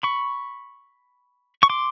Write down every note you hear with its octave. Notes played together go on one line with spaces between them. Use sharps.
B5 C#6
C#6
C6 D6